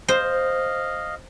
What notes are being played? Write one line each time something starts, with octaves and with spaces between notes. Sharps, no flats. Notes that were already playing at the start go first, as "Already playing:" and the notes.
C5 D#5 F5